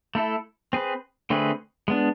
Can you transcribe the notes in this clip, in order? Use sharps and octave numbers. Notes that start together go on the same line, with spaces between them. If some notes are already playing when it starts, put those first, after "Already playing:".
A3 E4 A4
C4 G#4 B4
D3 A3 C4 G#4 B4
G#3 B3 D4